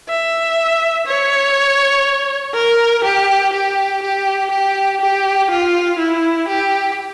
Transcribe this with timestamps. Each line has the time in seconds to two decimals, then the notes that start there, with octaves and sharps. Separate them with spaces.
0.09 E5
1.07 C#5
2.54 A#4
3.04 G4
3.53 G4
4.03 G4
4.51 G4
5.01 G4
5.50 F4
5.99 E4
6.48 G4